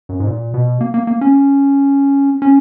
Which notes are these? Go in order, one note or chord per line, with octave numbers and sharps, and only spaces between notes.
F#2
G#2
A#2
B2
A#3
A#3
A#3
C#4
C#4